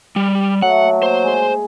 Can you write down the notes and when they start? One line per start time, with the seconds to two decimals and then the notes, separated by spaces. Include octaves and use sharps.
0.16 G3
0.62 F#3 A3 F#5
0.83 A#3
1.02 C5
1.23 G#3 G#4